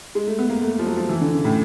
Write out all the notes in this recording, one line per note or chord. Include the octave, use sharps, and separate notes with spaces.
G#3
A3
B3
A#3
A3
F3
F#3
F3
E3
D3
C#3
A2